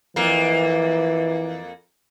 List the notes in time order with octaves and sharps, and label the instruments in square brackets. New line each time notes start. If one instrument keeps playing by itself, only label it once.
[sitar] F2 A#3 [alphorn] E3